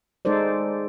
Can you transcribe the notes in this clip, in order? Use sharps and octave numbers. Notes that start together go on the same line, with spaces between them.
G#3 D#4 A4 C5 D5